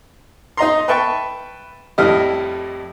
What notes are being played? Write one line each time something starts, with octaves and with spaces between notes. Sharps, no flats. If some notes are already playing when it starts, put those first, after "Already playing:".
D#4 D#5 A#5 C6
B4 E5 G5 A5 C#6
F2 A2 G3 E4 D#5 F6